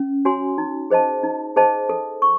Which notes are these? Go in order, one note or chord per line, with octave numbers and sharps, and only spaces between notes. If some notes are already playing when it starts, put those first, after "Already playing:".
Already playing: C#4
F#4 C#5 G#5 C6
D#4
G#4 C5 D#5 A5
D#4
G#4 C5 D#5 A5
A4
C#6